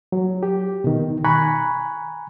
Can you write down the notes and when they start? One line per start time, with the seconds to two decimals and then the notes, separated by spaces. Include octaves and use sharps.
0.12 F#3
0.43 G4
0.84 B2 D#3
1.25 G#5 A#5 B5 C#6 F#6